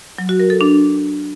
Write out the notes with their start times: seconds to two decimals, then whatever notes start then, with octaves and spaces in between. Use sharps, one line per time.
0.18 F#3
0.29 F#4
0.40 A#4
0.50 A4
0.61 D4